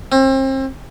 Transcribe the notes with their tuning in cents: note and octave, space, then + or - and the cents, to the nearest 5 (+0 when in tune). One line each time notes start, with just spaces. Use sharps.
C4 +35